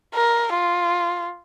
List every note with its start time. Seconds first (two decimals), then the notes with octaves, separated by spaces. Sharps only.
0.15 A#4
0.53 F4